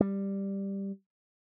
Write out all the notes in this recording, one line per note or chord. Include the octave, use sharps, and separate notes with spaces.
G3